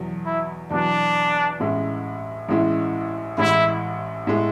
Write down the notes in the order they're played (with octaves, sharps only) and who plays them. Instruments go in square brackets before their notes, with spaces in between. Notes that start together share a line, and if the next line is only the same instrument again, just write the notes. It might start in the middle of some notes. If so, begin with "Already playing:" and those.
Already playing: [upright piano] E2 B2 F#3
[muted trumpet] E4
[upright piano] E2 B2 F#3 [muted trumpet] D4
[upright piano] A1 A2 G#3 C#4 E4
A1 A2 G#3 C#4 E4
[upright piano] A1 A2 G#3 [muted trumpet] E4
[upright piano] A2 G#3